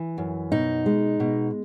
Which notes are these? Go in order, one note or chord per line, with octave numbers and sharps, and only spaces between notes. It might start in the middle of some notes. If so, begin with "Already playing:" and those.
Already playing: E3
F#2
B2 D#4
G#3
B2